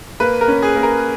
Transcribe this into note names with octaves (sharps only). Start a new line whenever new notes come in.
A#3 B4
A#4
C#4
G#4
A#3
A#4